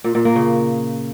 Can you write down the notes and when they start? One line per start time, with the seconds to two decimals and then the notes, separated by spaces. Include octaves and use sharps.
0.04 A#2
0.15 A#2
0.25 A#3
0.35 C#3